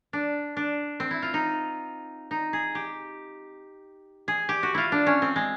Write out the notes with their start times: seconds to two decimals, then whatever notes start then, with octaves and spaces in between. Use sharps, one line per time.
0.13 D4
0.57 D4
1.00 C4
1.11 E4
1.22 F4
1.34 D#4
2.31 D#4
2.53 G#4
2.75 G4
4.28 G#4
4.49 G4
4.63 F#4
4.74 E4 F4
4.92 D4
5.06 C#4
5.22 C4
5.36 G#3